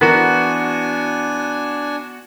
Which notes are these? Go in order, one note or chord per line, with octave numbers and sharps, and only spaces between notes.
E3 B3 D4 F#4 A#4 G#5 B5